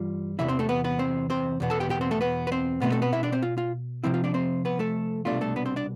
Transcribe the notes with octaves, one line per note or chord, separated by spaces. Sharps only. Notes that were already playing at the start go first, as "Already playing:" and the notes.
Already playing: G2 E3 G3 F4
E2 C3 E3 E4 E5
C4 C5
A3 A4
B3 B4
B3 B4
C4 C5
C4 C5
E2 B2 B3
A4 A5
G4 G5
G4 G5
C4 C5
A3 A4
B3 B4
B4
C4 C5
B2 A3 B3 C4 B4
A3 A4
B3 B4
E4 E5
D4 D5
C4 C5
F4
F4
C3 F3 C4 E4
F4
D4 D5
C4 C5
B3 B4
A3 A4
C2 B2 A3 D4 F4
A3 A4
B3 B4
C4 C5
D4 D5